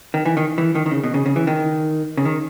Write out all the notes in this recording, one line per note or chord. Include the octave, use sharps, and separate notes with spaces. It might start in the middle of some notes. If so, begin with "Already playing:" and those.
D#3
E3
D#3
E3
D#3
D#3
C#3
B2
C#3
C#3
E3
D#3
C#3
D#3